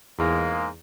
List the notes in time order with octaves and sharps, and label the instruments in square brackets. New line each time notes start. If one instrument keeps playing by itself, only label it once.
[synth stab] E2 [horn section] G#2 G#3 A#3